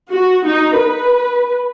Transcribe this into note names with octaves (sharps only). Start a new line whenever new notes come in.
F#4
D#4
B4